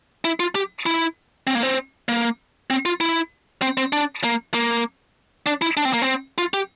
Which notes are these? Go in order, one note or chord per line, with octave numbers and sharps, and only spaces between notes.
E4
F4
G4
E4
C4
A#3
C4
A#3
C4
F4
E4
C4
C4
D4
A#3
A#3
D4
E4
D4
C4
A#3
C4
F4
G4